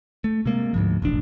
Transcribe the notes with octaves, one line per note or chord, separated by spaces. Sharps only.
A3
C3 G#3 A#3
D2 G#2 F3
E1 A1 D4